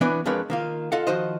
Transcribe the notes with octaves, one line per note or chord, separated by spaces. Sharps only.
E3 B3 D4 B4 C#5 D5
F2 G#3 D4 A#4 B4 C#5
D#3 A#3 F4
F4 A4 D#5 F5 F#5
D#3 F3 F#4 C5 D#5